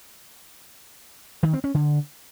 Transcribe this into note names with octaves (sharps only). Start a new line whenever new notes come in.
D#3
C4
C#4
D3